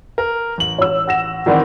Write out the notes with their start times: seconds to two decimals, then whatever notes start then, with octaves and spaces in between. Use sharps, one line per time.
0.18 A#4
0.58 A1 F#7
0.78 C#5 E6
1.07 F#5 A#6 E7
1.46 D#3 E3 C4 A#4 D5 F#5